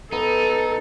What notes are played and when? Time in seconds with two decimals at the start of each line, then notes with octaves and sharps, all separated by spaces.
0.12 B3 D#4 A4